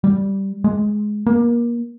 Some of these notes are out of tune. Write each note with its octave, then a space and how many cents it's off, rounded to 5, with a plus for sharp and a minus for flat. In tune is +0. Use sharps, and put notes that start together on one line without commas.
G3 -5
G#3 +10
A#3 +25